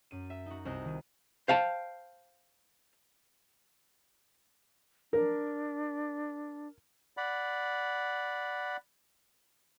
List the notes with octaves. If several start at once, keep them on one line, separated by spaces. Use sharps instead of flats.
F#2 D#7
E5
D#4 F#4
C2 C5 D#5 F#6
D#3 D#7
C5 F5 G5 A5
D4 A#4
D5 F#5 B5